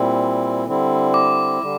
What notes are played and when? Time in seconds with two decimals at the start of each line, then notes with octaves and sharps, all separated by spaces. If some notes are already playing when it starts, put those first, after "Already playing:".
Already playing: A#2 G3 C4 E4
0.67 D3 G3 C4 E4
1.14 D6
1.62 D3 G3